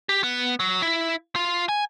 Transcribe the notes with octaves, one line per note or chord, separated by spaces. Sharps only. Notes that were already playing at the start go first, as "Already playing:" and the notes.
G4
B3
F#3
E4
F4
G#5